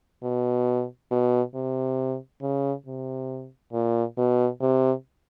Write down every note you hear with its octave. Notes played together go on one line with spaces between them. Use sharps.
B2
B2
C3
C#3
C3
A#2
B2
C3